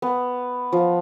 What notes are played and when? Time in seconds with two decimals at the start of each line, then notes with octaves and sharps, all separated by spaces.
0.02 B3
0.72 F3